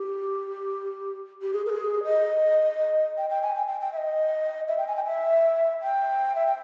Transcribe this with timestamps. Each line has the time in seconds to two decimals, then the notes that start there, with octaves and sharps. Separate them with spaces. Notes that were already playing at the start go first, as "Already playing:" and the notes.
Already playing: G4
1.42 G4
1.53 G#4
1.66 A#4
1.70 G#4
2.04 D#5
3.18 G5
3.30 G5
3.42 G#5
3.55 G5
3.67 G5
3.81 G5
3.93 E5
3.97 D#5
4.68 E5
4.78 G5
4.88 G#5
4.96 G5
5.05 E5
5.82 G5
6.35 E5
6.47 G5